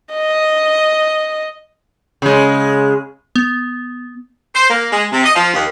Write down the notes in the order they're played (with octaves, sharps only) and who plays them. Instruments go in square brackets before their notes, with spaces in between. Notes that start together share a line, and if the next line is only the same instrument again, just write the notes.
[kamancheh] D#5
[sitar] C#3 G#3
[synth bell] B3
[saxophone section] C5
A#3
G#3
C3
D#5
F3
D#2